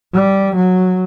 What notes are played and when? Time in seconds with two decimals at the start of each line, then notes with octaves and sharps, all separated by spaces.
0.13 G3
0.55 F#3